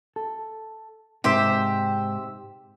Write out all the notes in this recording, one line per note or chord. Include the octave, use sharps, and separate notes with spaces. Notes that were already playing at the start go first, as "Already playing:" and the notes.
A4
G#2 C3 D#4 G4 C5 E5